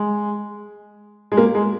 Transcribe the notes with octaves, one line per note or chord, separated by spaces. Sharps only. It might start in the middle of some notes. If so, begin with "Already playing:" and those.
Already playing: G#3
G#3
A#3
G#3